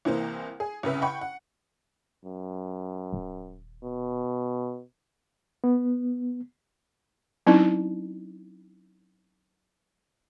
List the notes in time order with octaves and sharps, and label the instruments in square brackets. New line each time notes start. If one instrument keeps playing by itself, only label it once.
[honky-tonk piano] C2 E3 A#3 C5
G#4
C2 C#3 B4 E5
F#5 G5 B5 C#6
F#5
[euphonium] F#2
[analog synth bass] D#1
[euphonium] B2
[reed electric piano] B3
[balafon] F#3 C4 C#4 D#4 E4